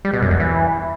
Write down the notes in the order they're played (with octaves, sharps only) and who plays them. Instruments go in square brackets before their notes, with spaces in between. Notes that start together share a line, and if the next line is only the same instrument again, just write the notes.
[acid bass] G3
B2
F#2
E2
E3